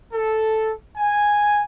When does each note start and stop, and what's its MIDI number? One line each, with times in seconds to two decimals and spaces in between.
0.13 0.71 69
0.96 1.61 80